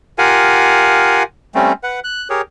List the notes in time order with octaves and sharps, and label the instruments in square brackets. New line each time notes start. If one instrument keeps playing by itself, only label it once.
[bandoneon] F4 G4 A#4 F5 F#5 G#5
G3 A3 C4 C#4
B4 F#5
F#6
G4 G#4 A#4 C#5